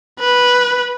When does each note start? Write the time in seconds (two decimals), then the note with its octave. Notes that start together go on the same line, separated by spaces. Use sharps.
0.20 B4